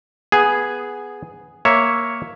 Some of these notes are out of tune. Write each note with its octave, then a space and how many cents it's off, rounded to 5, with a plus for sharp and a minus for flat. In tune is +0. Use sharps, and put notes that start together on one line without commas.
B3 +0 G#4 +0
A#3 +0 C#5 +0 E5 +0